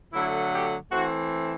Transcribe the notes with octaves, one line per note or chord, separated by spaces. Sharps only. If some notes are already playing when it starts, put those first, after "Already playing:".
D3 F#3 A3 E4
G4
E3 A3 C4 F#4